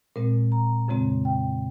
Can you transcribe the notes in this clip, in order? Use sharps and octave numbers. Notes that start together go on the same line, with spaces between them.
A#2 G#3 C4 A#4
A#5
F2 C#3 G#3 C4
G5